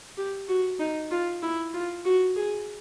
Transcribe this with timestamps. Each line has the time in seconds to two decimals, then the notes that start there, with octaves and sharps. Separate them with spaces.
0.17 G4
0.49 F#4
0.80 D#4
1.11 F4
1.43 E4
1.74 F4
2.05 F#4
2.36 G#4